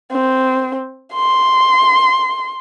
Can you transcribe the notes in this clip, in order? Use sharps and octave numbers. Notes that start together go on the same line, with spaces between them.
C4
C6